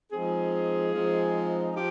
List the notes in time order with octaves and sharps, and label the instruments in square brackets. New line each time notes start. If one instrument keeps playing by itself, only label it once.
[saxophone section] F3 G#3 C4 D#4 G#4
F3 G#3 C4 D#4
F3 G4